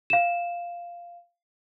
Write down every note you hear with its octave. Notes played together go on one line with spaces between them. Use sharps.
F5 E7